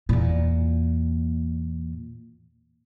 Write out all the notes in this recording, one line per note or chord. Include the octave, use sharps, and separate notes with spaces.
E2 A#2